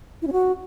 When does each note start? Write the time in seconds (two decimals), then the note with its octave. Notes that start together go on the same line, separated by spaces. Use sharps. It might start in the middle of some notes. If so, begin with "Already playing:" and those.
0.22 E4
0.27 C#4
0.32 F#4